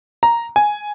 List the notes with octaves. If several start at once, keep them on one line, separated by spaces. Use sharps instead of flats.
A#5
G#5